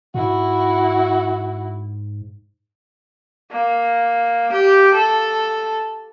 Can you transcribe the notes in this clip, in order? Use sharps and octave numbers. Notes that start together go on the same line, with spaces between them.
G#2 E4 F#4
A#3
G4
A4